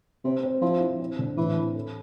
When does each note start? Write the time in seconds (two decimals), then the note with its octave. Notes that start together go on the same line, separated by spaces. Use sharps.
0.24 C3 C4
0.43 C4
0.62 F3 E4
0.81 E4
1.00 C4
1.19 D3
1.37 A2 E3
1.56 C4
1.75 A4